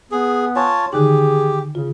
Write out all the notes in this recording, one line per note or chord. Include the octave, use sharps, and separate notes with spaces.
B3 G#4
F4 C#5 G#5 A5
D3 D#3 D#4 G4 G#4
C#3 F4